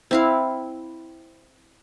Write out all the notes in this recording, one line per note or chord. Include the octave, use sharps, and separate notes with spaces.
C4 E4 F5